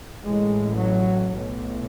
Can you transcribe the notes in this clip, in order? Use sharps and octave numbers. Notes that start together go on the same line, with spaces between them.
A1 A2 G#3
F#3
B1 A2